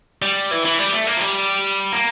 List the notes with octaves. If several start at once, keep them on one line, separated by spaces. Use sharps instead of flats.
G3
E3
E3
G3
A3
A#3
F3
G3
A#3